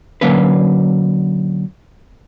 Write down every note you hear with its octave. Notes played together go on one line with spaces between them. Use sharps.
D3 F#3 A#3 C#4 B4